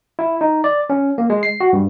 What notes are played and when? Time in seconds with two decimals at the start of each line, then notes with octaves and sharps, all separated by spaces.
0.19 E4
0.41 D#4
0.64 D5
0.90 C#4
1.18 A#3
1.30 G#3
1.43 C7
1.60 F#4
1.73 G2